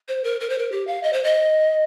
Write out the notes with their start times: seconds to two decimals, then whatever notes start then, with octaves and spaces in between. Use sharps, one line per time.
0.08 C5
0.24 A#4
0.40 A#4
0.50 C5
0.59 A#4
0.72 G4
0.87 F5
1.03 D#5
1.13 C5
1.24 D#5